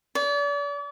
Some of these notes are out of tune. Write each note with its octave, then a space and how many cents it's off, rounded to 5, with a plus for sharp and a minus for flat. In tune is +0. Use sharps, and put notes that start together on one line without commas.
D5 -40